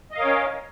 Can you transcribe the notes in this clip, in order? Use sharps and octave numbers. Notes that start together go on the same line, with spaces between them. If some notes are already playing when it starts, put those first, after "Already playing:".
C#4 A#4 C#5 D#5 F5